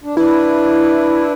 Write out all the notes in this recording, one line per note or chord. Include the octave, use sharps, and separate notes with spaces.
D4
D4 E4 B4